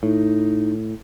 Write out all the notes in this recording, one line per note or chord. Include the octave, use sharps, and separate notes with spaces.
A2 D#4